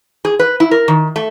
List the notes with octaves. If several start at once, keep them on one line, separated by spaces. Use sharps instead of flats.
G#4
B4
E4
A#4
D#3
A3